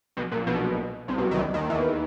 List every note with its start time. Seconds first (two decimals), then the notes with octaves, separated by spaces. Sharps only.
0.17 B1 B2
0.31 A#1 A#2
0.47 B1 B2
1.08 C2 C3
1.18 B1 B2
1.31 D#3
1.38 D2 D3
1.54 D#2 D#3
1.69 E2 E3